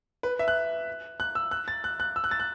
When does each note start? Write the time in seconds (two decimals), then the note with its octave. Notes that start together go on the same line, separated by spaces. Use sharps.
0.23 B4
0.39 E5
0.48 F#6
1.20 F#6
1.35 E6
1.51 F#6
1.68 A6
1.84 F#6
2.00 F#6
2.16 E6
2.24 F#6
2.31 A6
2.40 F#6